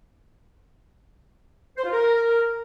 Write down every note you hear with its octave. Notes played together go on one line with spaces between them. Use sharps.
C5
F4
A#4